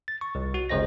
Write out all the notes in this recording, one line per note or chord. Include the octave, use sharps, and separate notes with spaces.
A6
C#6
C2
F#4
G1 C#2 C#3 C5 D#5 A#6